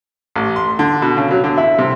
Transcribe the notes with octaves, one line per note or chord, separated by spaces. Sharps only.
A1
C6
D3
B2
C#3
F#3
D3
E4
C3